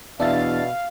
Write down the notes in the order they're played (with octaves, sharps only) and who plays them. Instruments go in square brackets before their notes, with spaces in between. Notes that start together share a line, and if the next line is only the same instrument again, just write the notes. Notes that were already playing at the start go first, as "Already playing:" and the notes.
[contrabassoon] E2 [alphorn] B2 [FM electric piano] D4 E5 A6 [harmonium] F5